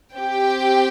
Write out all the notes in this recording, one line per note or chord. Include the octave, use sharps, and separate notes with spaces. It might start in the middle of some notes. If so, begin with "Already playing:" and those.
C4 G4 G5